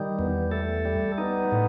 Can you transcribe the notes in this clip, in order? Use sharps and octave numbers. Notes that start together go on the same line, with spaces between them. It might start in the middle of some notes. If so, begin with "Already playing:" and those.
Already playing: D#3 G3
E2 B3
A3 A4
G3
B3 D#4
A2